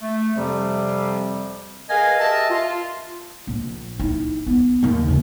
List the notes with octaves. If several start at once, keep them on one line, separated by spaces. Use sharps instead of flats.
A3
F2 C3 F3 G3
G#4 A#4 B4 D#5 F5 G#5
G4 A#4 D#5 E5 A5
F4
A#1
D#4 E4
B3
D#2 D#3
C#3 E3